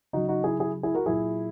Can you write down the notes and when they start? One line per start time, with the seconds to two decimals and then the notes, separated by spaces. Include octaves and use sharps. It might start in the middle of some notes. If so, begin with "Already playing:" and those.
0.13 C#3 F#3 D#4 F#4
0.28 D#4 F#4
0.44 E4 G#4
0.59 E4 G#4
0.83 E4 G#4
0.95 F#4 A#4
1.06 A#2 F#3 E4 G#4